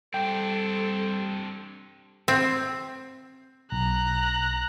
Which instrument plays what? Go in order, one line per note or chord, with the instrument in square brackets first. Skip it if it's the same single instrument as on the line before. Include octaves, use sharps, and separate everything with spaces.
[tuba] G3 [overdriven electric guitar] C4 D4 [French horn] A4 [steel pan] G5
[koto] C4
[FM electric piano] B1 [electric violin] A#5 F#6